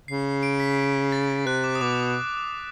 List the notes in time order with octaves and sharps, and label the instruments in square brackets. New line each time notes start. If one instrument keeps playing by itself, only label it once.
[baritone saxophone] C#3 [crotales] C7
[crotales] D7
B6
A6
[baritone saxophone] C3 [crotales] F#6
[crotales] D6
D#6
[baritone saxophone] B2 [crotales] D6